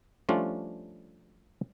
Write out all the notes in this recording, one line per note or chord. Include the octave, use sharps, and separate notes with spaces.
F3 G3 A3 C#4 D4 F4